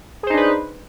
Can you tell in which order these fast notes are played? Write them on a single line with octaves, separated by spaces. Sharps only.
G#4 C5 D#4 D4 B4